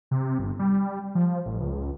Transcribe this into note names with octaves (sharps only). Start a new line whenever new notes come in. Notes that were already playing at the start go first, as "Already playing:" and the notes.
C3
G1
G3
F3
A1
C#2